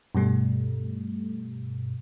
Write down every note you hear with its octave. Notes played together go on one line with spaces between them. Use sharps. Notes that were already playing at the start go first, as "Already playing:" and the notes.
G2 B2 G3 A3